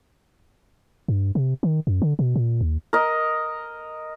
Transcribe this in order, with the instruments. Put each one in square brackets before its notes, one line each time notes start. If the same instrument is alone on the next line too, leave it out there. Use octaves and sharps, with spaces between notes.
[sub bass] G2
C3
D#3
F#2
D3
B2
A#2
D#2
[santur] A#4 D#5